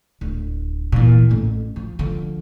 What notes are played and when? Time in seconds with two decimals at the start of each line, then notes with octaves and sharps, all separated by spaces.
0.21 D1
0.92 A#2 E3
1.29 A1 F2
1.76 F3
1.99 D3 F3